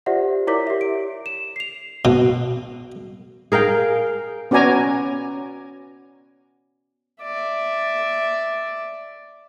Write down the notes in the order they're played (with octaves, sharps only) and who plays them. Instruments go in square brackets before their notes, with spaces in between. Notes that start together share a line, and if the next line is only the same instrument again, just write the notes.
[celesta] F4 G4 C5 D5 E5 F#5
E4 A#4 C#5 D5 D6 B6
G4 E5
D7
E7
C7 F7
[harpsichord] B2
[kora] G#4 A#4 F5 G5
[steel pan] B3 C#4 F#4 D5 G#5 A#5
[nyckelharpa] D5 E5